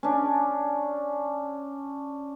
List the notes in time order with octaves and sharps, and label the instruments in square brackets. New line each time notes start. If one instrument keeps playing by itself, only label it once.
[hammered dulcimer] C#4 D4